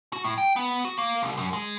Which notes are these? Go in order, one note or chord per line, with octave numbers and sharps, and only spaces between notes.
F#4
A2
G5
B3
F#4
A#3
C2
F#2
G#3